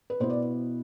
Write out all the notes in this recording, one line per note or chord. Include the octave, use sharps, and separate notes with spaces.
B4
B2 B3 E4 C5
D5